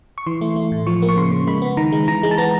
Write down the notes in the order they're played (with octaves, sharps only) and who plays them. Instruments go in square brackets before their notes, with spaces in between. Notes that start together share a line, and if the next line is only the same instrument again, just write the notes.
[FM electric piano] C#6
E3 C6
A3
A3
A2
F3 C#6
A#3
C#6
C#3 C6
C#3
G#3 B5
B3
D#3 A#5
G#3
E3 A#5
G#3
A5
B3 A#5